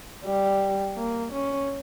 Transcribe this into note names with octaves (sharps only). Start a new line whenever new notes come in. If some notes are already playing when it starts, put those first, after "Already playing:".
G3
A#3
C#4